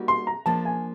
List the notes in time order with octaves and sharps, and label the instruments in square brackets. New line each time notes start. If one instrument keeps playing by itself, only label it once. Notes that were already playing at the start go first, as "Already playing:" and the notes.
Already playing: [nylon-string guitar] G3 A#3 D#4 F#4
[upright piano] C6
A#5
[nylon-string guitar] F3 A#3 D4 [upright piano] A5
[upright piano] G#5